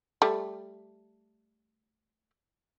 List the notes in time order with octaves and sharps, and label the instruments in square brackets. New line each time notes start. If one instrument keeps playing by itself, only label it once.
[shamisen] G3 A3